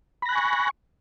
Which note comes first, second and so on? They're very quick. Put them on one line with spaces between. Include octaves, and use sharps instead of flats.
B5 A#6 F#6 G#5 C#6